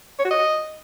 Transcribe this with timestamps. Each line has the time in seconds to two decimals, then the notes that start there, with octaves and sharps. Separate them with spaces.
0.19 C#5
0.25 F#4
0.31 D#5